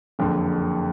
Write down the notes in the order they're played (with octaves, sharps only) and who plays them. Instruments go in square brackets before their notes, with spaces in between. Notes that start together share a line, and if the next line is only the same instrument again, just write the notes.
[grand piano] F#1 F2 D3